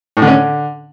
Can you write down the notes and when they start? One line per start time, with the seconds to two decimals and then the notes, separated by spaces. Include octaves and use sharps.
0.17 A2
0.22 D3
0.27 C#4
0.33 D3